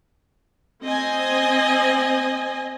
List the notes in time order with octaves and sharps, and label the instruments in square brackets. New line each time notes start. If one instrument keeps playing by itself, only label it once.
[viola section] C4 D#5 G#5